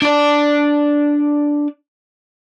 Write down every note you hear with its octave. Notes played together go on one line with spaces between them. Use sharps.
D4 D5